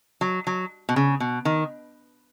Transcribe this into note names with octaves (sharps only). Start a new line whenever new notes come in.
F#3
F#3
B2
C#3
B2
D#3